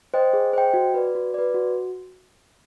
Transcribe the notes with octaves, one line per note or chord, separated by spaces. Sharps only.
C5 D#5 G5
G#4
C5 D#5 G5
F#4
B4 D5
F#4
B4 D5
F#4